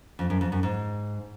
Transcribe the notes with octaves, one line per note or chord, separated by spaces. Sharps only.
F2
F#2
F2
F#2
G#2